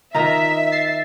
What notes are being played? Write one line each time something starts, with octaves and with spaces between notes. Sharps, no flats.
D#3 D#4 F4 E5 A#5
A6 C7